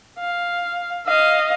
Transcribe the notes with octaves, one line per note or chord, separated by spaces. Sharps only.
F5
D#5 F5